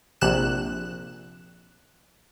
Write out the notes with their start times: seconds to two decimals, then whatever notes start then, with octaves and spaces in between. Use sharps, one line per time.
0.21 A#1 C3 F#6 E7